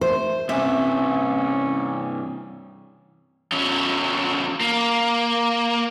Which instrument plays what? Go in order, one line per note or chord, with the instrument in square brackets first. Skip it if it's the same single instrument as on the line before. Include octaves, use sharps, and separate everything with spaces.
[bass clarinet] A3 [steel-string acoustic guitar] C5
[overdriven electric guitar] G2 C3 [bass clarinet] C#4 [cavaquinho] E5
[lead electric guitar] E2 C#4
A#3